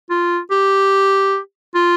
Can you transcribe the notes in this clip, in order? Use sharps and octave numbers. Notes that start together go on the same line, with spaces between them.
F4
G4
F4